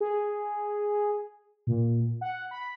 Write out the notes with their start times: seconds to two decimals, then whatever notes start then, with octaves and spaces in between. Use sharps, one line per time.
0.01 G#4
1.67 A#2
2.21 F#5
2.51 B5